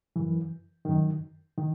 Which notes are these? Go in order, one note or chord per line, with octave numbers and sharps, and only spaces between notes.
F#2 E3
F#2 D#3
D#3